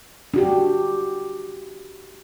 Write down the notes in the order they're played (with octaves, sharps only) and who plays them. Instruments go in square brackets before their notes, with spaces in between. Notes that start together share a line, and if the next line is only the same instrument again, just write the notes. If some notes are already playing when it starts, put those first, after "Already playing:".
[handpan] D4 F#4 G4